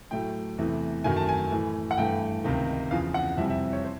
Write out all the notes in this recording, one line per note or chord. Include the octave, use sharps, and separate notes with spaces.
A2 F#3 A3 G5
E2 C3 E3 A3
F#2 D#3 F#3 A3 G#5
A5
G#5
A2 E3 A3
F#5
G2 E3 A3 G5
C#2 C3 D#3
E2 C#3 F3 F5
F#5
F2 C3 E3 G3 E5
E5
C#5
C5